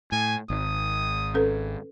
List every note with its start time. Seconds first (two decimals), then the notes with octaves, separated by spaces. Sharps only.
0.12 A2 G#5
0.50 G#1 D#6
1.34 C#4 A4 B4